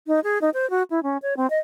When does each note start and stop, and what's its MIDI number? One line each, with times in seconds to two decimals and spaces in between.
0.07 0.20 63
0.24 0.38 68
0.42 0.50 63
0.54 0.69 72
0.70 0.83 66
0.90 1.03 64
1.03 1.17 61
1.22 1.37 73
1.37 1.49 60
1.50 1.58 75